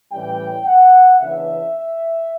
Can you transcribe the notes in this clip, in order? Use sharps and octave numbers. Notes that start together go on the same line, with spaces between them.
A2 E3 G3 C#4 G5
F#5
C#3 E3 B3 D4 E5